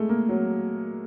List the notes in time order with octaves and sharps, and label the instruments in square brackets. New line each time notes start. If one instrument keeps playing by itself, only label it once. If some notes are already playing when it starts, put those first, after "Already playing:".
Already playing: [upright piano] G#3 A3
A#3
F#3